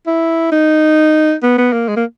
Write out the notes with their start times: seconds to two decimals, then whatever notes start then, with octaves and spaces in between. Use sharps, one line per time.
0.07 E4
0.52 D#4
1.43 B3
1.58 B3
1.73 A#3
1.88 G#3
1.96 A#3